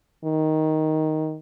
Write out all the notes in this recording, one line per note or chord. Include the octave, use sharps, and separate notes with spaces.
D#3